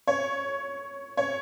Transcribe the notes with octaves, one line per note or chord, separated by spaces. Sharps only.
C#5
C#5